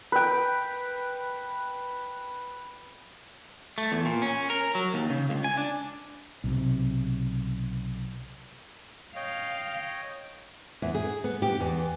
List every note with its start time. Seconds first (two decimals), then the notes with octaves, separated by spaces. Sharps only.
0.12 B4 G5
3.78 A3
3.92 E2
4.05 A#2
4.22 C#4
4.50 A#4
4.75 F#3
4.94 D#2
5.10 C#3
5.30 C#2
5.44 G#5
5.57 D4
6.44 B1 C3
9.16 C#5 D#5 F5 G5
10.82 E2
10.95 G#4
11.24 B3
11.42 G4
11.60 E2